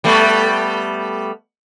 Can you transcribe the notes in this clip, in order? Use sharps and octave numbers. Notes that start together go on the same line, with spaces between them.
G3 A3 B3